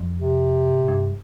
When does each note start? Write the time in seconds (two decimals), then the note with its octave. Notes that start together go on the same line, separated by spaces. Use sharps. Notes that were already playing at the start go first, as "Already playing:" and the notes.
Already playing: F2
0.18 C3
0.70 G2
0.79 A2
0.88 G2